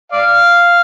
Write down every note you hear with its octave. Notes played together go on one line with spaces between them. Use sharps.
D5 F5